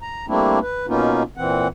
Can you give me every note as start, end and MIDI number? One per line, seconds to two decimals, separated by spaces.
0.02 0.26 82
0.28 0.59 55
0.28 0.59 57
0.28 0.59 58
0.28 0.59 60
0.28 0.59 62
0.28 0.59 64
0.62 0.86 71
0.88 1.23 47
0.88 1.23 58
0.88 1.23 59
0.88 1.23 61
0.88 1.23 63
0.88 1.23 65
1.37 1.68 46
1.37 1.68 52
1.37 1.68 60
1.37 1.68 78